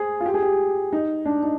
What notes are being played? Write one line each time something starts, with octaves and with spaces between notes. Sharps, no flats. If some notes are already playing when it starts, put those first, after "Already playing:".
Already playing: G#4 C5
F4
G4
G#4
G4
D#4
D4
D#4